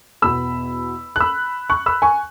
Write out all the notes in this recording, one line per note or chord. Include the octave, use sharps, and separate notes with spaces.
E2 B2 B3 B5 E6
F#6
B5 E6
C#6 F#6
B5 E6
G#5 C#6